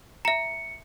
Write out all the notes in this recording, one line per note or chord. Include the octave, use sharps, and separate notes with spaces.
E5 A#5 C#7